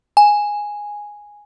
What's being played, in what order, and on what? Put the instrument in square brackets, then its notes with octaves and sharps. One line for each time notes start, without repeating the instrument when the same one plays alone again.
[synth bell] G#5